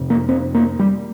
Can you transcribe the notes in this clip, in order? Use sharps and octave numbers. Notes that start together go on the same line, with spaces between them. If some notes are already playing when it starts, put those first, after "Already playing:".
Already playing: F2 C3
A#3
C4
A#3
G3